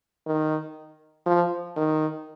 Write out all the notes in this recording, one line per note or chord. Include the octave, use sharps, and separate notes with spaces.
D#3
F3
D#3